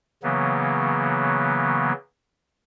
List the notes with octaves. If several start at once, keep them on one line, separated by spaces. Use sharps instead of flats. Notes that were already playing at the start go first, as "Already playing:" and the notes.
C#3 E3 F#3 A#3 B3